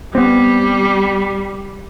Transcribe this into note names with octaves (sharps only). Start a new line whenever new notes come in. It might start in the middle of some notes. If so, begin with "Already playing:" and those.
G3 B3 C4